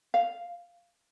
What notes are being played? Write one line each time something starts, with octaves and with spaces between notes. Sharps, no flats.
F5